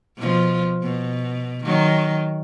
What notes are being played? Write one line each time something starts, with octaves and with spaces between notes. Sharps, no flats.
B2 F3
B2
D#3 F#3